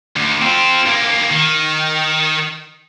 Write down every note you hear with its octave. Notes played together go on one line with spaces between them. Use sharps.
D2
C4 F4
G2 A#3
D#3